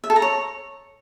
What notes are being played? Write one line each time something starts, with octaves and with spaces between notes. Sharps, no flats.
E5
A4
A#5
C#5